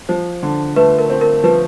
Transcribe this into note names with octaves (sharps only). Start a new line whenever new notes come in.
F3 C5
D3
A3 B4
A#4
C4
A#4
F3 B4